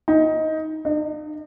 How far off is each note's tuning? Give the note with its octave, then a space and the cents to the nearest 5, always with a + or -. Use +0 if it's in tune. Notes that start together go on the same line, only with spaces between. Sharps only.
D#4 +15
D#4 -45